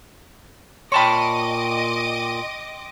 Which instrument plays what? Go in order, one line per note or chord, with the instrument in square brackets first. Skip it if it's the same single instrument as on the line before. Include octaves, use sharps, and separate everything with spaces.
[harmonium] A#2 [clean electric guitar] C#5 A5 B5 [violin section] D#5 D6 [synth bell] G5 C6